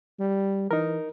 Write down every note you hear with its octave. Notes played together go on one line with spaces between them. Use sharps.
G3
E3 D#4 A#4